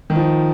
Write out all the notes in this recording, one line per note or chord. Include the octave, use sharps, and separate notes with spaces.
D#3
F3